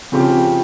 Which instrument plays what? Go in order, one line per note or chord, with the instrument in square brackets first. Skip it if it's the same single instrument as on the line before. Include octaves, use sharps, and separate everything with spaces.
[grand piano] C#3 F3 C4 G4